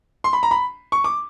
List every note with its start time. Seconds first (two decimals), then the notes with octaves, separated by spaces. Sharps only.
0.24 C6
0.33 B5
0.43 A#5
0.51 B5
0.92 C#6
1.04 D6